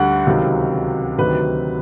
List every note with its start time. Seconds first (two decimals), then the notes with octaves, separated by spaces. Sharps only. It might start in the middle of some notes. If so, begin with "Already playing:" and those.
Already playing: D2 D3 G3 F#5
0.26 C#2 C3 D#3 F#3
1.18 D2 C3 D#3 F#3 B4